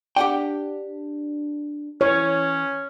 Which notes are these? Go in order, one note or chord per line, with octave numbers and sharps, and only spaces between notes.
D4 G4 F#5 G5
E3 C#4 C#5